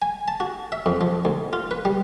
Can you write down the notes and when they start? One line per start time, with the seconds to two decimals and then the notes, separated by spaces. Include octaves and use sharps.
0.02 G#5
0.28 A5
0.40 F#4
0.72 E5
0.86 F2
1.01 F3
1.25 D2
1.53 F4
1.71 B4
1.85 G3